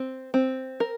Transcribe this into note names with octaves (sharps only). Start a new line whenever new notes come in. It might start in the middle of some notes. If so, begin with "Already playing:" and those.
Already playing: C4
C4
A#4